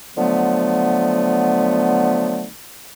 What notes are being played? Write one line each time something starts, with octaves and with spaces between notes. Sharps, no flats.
D3 F3 F#3 A3 B3